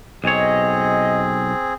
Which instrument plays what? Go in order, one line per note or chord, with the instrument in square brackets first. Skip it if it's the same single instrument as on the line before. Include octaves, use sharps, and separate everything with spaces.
[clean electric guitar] B1 C#5 [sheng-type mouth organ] C4 G#4 [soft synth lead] D#5